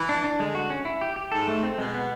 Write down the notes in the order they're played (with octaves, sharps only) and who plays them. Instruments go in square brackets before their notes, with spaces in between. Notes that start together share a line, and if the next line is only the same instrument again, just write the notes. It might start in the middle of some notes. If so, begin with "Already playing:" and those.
Already playing: [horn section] E3
[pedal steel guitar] D4
D4
[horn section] D3 [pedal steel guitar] G#3
[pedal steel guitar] F#4
C#4
E4
G4
G4
[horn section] G#2 [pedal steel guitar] A4
[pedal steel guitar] A3
C4
[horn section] B2 [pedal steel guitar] G#3
[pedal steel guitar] B3